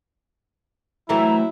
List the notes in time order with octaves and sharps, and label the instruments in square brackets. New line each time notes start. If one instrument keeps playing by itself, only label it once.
[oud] E3 A3 C4 [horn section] F#3 E4 [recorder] A#5